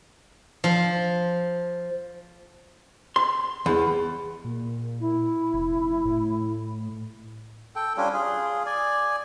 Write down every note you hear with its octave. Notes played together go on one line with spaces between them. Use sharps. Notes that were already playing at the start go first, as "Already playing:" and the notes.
F3
C6
E2
A#2
E4
F1
A2
A4 G5
G3 C#4 D4 F4
F4 G#4
D5 G#5